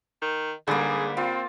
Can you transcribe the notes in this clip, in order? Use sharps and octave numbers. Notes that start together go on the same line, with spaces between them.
D#3
G#2 D3 G3 A#3 G#4
C4 F4